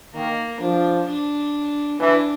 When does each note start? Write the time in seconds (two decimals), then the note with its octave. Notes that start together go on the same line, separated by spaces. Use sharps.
0.14 D#3 A#3
0.60 F3 D4
1.06 D4
1.99 E3 D4